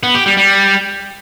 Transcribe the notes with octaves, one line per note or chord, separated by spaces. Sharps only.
B3
G4
G3
G3